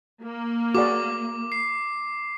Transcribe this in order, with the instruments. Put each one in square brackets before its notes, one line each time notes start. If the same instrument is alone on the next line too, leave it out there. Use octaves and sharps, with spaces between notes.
[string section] A#3
[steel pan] F#4 G#4 D5 [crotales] D6
[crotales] C7